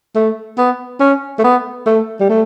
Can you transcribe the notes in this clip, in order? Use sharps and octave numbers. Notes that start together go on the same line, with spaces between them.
A3
B3
C#4
A3
B3
A3
G3
A3